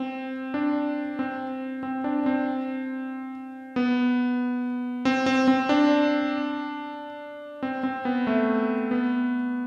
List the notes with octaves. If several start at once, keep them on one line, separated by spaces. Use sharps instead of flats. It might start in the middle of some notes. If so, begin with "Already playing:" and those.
Already playing: C4
D4
C4
C4
D4
C4
B3
C4
C4
C4
D4
C4
C4
B3
A3
B3